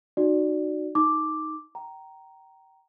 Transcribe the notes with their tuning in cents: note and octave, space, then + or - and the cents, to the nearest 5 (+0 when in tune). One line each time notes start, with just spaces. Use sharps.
D#4 -30 F#4 +0 D5 +0
D#4 +5 D6 +0
G5 -25 A#5 +0